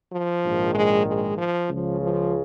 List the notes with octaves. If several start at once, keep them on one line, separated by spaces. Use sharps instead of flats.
F3
A#1 G#2 D#3
G#3
G#3
F3
C#2 C#3 F3
F3